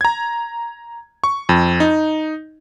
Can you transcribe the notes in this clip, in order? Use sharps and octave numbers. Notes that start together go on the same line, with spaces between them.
A#5 G#6
C#6
F2
D#4